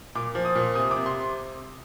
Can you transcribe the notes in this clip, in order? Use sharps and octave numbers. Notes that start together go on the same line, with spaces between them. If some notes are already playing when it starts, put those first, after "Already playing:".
A#2 D6
F3
D#6
A#2
C3 D#6
D6
C3
C6